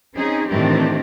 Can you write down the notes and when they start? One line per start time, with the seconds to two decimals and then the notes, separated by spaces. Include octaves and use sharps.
0.16 C4 C#4 D#4 G#4
0.49 A2 D#3 E3 C4 D4 G4